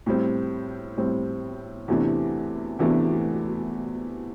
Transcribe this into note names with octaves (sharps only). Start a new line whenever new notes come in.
A2 G3 C4
A2 G3 C4
E2 C3 E3 A3 D4
E2 C3 E3 A3 D4